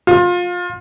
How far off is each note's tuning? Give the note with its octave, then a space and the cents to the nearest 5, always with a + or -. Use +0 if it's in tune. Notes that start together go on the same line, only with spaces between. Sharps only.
F4 +25